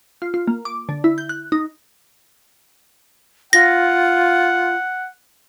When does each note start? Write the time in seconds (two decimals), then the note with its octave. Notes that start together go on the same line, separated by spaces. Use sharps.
0.22 F4
0.34 F4
0.47 A#3
0.65 D6
0.89 D3
1.04 E4
1.18 G6
1.29 F#6
1.52 D#4
3.53 F4 F#5 A#6